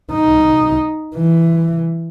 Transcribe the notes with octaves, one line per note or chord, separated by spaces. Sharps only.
D#4
E3